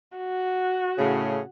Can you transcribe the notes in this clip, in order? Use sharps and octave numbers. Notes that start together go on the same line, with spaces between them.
F#4
A2 C#3